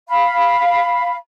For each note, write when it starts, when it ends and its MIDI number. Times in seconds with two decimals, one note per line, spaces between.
0.08 1.15 77
0.08 1.15 83